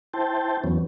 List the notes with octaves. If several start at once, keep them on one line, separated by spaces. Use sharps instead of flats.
E4 C5 G5 A5
E2 E3 F#3 B3 C#4